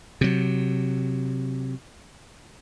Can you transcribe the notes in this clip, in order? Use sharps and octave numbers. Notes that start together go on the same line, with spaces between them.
C3 F#3